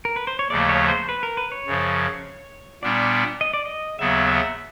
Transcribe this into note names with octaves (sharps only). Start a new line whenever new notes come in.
A#4
B4
C5
C#5
D#2 C#3 F3 A3 D5
C#5
C5
B4
A#4
B4
C#5
F#2 C#3 F3
A#2 G3 B3 D4 D5
D#5
D5
D#5
D#2 C#3 F#3 B3 E5
E5